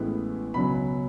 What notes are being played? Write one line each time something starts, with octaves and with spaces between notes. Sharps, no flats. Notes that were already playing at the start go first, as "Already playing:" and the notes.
Already playing: A1 A2 G#3 B3 E4
C#2 B2 F#3 C#4 B5